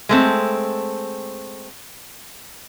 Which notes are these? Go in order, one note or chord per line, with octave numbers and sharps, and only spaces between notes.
G#3 A3 C4